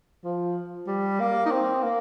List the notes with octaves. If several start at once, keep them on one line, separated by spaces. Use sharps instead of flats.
F3
G3
A#3
D#4
C4
A#3